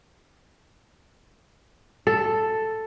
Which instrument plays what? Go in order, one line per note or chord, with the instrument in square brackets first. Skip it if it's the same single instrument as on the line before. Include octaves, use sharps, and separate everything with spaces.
[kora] A4